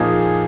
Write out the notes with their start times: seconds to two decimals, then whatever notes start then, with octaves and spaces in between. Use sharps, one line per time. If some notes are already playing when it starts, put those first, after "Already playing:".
Already playing: A#2 F3 A#3 D#4 G#4